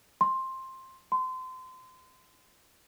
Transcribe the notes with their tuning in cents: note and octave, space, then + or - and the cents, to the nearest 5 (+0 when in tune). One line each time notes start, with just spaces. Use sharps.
C6 +10
C6 -30